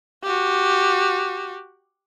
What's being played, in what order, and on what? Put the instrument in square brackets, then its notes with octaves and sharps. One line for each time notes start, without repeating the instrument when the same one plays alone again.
[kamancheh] F#4 G4